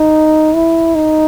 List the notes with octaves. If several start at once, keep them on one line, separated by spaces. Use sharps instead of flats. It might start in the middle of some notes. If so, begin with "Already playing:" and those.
Already playing: D#4
E4
D#4